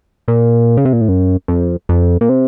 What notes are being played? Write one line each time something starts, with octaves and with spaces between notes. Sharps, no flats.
A#2
C#3
C3
A#2
A2
F#2
F2
F2
A#2
C3